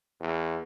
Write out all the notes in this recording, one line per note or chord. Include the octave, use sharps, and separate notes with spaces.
E2